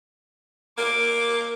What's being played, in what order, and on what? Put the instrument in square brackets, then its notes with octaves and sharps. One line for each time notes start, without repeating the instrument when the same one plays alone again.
[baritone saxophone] A#3 [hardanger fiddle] D6